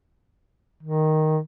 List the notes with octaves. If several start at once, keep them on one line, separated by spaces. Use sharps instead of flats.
D#3